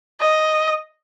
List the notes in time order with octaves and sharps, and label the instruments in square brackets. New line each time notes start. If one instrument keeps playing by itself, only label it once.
[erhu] D#5